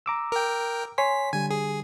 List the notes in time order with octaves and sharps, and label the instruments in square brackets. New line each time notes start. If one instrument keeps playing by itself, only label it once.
[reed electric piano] A#5 D6 E6
[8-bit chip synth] A#4 G5
[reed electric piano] C#5 G#5 C6 [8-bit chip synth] B6
[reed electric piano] D3 G3 [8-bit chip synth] G#5
[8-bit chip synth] G#4